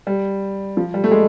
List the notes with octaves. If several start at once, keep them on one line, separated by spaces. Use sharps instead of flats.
G3
F3
G3
A3
G#3